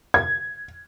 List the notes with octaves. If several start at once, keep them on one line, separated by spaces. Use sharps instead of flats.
G#6